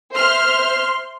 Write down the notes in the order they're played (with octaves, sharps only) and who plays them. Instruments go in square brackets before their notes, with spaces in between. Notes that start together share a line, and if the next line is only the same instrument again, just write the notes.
[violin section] C5 E5 F6 [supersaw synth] C6